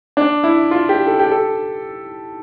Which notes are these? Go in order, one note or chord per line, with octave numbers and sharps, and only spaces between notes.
D4
E4
F4
G4
A4
G4
A4